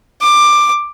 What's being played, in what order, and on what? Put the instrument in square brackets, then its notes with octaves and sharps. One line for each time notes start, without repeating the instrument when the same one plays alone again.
[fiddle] D6